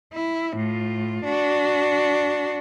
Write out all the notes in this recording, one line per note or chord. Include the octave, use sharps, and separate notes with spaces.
E4
A2 F4
D4 F#4